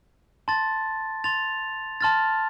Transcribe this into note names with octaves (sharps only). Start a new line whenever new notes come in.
A5 C6 A6
C6 A6 F7
A5 C6 F6 A6